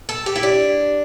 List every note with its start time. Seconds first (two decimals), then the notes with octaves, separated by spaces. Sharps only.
0.09 A4
0.26 G4
0.36 E4
0.43 D4